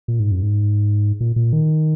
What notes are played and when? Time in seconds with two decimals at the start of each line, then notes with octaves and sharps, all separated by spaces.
0.08 A#2
0.20 G#2
0.31 F#2
0.43 G#2
1.20 A#2
1.36 A#2
1.53 D#3